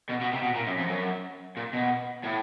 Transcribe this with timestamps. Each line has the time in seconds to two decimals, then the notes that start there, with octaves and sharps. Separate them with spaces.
0.10 B2
0.21 B2
0.33 C3
0.43 B2
0.55 A#2
0.67 F#2
0.78 F2
0.88 F#2
1.57 A#2
1.73 B2
2.23 A2